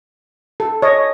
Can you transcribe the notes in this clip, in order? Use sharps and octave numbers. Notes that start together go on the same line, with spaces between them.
A4
C#5 D#5